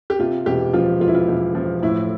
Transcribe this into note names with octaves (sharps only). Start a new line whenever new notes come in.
G4
C3 F4
E1 G4
F3 F4
E1 F4
E4
F4
E1
F3
A2 E4